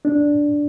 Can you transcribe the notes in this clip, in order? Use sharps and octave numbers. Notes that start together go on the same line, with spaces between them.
D4